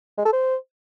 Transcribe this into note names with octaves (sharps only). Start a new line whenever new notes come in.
G#3
A4
C5